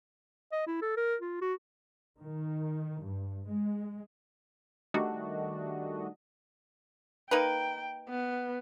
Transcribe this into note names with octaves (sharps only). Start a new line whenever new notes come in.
D#5
E4
A4
A#4
F4
F#4
D#3
G2
G#3
D#3 G3 A3 D4 F#4 D#5
A#3 D#4 B4 G5
B3